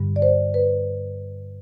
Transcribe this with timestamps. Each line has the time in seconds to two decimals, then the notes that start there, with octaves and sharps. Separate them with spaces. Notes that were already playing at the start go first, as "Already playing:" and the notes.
Already playing: G2 D3 G3
0.16 D5
0.22 C5
0.54 B4